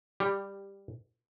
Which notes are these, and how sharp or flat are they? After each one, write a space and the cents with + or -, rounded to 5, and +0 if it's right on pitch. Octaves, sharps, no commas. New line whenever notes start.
G3 +10 G4 +0